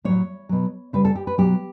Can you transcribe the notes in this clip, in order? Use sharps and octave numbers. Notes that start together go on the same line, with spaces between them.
A2 F#3 C#5
B2 F#3
C#3 G3 B4
A4
G4
B4
B2 F#3 G4